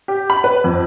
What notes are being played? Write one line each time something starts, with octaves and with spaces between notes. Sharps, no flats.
G4
B5
B4
F2